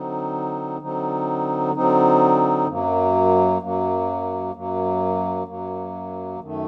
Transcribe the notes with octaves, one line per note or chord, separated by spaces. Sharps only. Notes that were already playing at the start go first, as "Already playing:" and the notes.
Already playing: D3 F#3 C4 D#4
D3 F#3 C4 D#4
D3 F#3 C4 D#4
F#2 F#3 A#3
F#2 F#3 A#3
F#2 F#3 A#3
F#2 F#3 A#3
F#2 D#3 A3